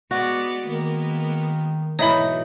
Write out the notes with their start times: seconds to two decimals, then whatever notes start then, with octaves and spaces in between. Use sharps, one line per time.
0.11 G#3 B3 F#4 D5
0.66 D#3 G#3 A#3 B3
1.99 G#2 B2 E3 F#3 D#4 C#5 E5 B5